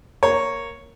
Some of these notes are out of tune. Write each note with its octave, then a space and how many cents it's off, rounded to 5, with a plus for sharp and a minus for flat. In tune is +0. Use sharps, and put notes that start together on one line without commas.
A#3 +0 C#5 +0